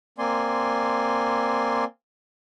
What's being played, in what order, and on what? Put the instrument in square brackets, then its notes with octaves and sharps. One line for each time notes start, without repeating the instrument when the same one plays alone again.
[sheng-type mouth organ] A#3 C4 D5 G#5 C6